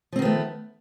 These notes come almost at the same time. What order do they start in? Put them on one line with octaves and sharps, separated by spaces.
F3 C4 D#3 B3 A3